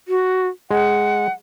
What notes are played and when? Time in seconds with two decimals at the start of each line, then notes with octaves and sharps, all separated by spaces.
0.08 F#4
0.71 G#3 F#5